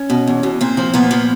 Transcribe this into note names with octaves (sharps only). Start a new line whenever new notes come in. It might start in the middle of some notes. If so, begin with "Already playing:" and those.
Already playing: C#4
B2
E2
B2
A#2 C4
F3
A#2 B3
F3